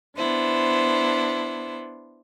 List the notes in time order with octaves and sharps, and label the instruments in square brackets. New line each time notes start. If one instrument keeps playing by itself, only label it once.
[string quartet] B3 D4 E4 C5